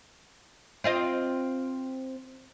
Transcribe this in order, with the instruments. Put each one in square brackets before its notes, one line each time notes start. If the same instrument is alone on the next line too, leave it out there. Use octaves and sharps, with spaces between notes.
[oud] C4 F4 D#5